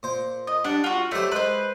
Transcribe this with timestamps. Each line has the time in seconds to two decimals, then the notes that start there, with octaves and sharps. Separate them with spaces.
0.03 A#2 C5
0.47 D#5
0.64 G3 D4 F#5
0.84 F4 F#4
1.11 F#3 G3 A3 C5 D5
1.31 G#3 B4 C5